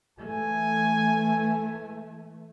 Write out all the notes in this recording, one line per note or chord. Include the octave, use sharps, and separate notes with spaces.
E3 A3 G#5